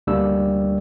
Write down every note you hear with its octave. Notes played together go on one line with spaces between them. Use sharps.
D2 G3 A#3 D4 E6